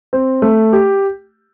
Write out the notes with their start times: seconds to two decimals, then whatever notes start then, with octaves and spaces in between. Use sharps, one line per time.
0.13 C4
0.42 A3
0.73 G4